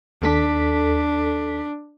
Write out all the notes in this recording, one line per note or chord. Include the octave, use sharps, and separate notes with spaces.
D#2 D4 A4 B6